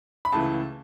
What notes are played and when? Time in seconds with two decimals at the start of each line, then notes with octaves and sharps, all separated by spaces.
0.25 B5
0.32 C#2 C#3 E3 A3 E4 A5